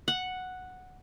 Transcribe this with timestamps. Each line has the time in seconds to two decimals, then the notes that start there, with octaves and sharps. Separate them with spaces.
0.08 F#5